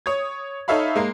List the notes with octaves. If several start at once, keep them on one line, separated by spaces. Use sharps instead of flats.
C#5 D#6 G#6
D#4 A4 C#5 E5 F5 B5
G#3 A#3 C7